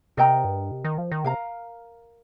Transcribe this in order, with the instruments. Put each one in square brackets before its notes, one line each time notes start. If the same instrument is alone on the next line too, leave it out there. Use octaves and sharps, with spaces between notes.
[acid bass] C3 [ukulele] A#4 D#5 G5 A#5
[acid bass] G2
C3
D#3
F3
D#3
[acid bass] C3 [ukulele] A#4 F5 A#5